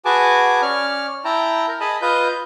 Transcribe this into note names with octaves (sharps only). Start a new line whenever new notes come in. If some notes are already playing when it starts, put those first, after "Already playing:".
F#4 G#4 B4 G#5 A5 D6
C#4 D5 F6
E4 G5 A5 A#5
A#4
G#4 D#5 A5 B5
F4 B4 D#5 G6